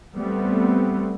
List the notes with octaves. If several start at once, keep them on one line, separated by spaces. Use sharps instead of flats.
G3 A3 B3 C4